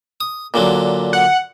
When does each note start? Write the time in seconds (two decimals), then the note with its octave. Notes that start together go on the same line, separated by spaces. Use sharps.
0.21 D#6
0.54 A#2 D3 F#3
1.13 F#5